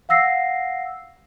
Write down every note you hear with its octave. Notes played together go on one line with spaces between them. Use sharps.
F5 F#5 E6 A#6 C7